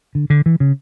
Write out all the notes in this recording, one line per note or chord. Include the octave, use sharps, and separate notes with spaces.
D3
D3
E3
C#3